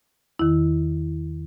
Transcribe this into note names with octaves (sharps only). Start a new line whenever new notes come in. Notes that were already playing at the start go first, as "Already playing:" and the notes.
E2 D#3 E4